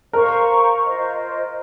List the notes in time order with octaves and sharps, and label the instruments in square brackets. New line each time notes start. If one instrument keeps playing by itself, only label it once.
[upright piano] A#4 [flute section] C5 F5 A#5 C#6
[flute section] F4 C5 D#5